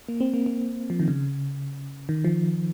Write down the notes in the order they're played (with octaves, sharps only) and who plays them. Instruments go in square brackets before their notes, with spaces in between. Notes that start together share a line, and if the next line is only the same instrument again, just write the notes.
[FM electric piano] A#3
C4
A#3
A#3
F3
D#3
C#3
D#3
F3